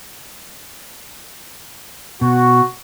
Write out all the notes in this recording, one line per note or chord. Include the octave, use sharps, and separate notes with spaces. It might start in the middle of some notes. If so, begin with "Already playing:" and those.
B2 F#4